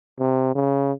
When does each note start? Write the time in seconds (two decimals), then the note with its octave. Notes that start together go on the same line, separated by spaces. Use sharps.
0.19 C3
0.55 C#3